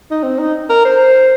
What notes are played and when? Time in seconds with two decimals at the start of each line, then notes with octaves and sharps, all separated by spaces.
0.11 D#4
0.23 C4
0.39 D#4
0.70 A#4
0.85 C5